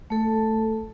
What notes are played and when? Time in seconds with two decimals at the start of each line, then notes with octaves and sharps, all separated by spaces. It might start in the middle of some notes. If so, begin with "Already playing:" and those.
0.10 A3 A4